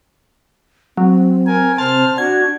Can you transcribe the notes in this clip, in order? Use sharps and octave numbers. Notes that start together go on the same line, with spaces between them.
F#3 C4
A#4 G#5
C3 C5 A5 F6
D4 F#4 G#6